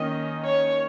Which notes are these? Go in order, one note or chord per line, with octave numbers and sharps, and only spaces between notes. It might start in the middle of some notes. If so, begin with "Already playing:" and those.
Already playing: D#3 A#3 C#4 D#5
C#5